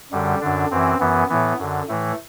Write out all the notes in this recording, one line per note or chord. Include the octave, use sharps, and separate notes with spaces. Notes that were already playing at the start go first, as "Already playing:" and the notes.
F#2 D3 G3
F#2 D3 D4
F#2 E3 C4
F#2 E3 B3
A2 E3 B3
F#2 D3
A2 E3 A3